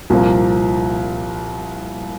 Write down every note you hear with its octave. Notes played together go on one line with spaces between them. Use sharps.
C2 A#2 F3 A#3